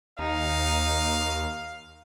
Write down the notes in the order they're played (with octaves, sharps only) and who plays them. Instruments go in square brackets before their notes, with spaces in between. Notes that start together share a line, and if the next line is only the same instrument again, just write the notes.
[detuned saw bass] D#2 [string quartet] D#4 [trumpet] F5